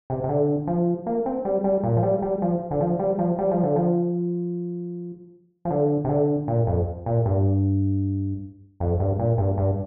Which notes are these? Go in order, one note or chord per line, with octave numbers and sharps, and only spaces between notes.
C3
C3
D3
F3
A#3
C4
G3
G3
A#2
F3
G3
G3
F3
D3
F3
G3
F3
G3
F3
D3
F3
F3
D3
C3
D3
A#2
F2
A#2
G2
F2
G2
A#2
G2
G2